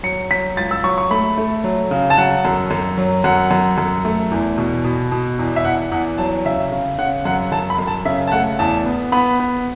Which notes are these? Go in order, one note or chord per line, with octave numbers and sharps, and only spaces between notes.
F#3 C#7
F#3 B6
C#2 A6
E6
F#3 C#6
C#6
A3 B5
A3
F#3
C#3
A5
F#3 F#5
F#2
F#2
F#3
F#2 F#5
F#2
F#2
A3
E2
B2
B2
B2
E2
E5
E2 F#5
E2 F#5
F#3 A5
C#3 E5
C#3
C#3 F#5
F#2 F#5
F#2 A5
B5
F#2
A5
C#3 E5
A5
A3 F#5
E2 A5
B3
B3 B5
B3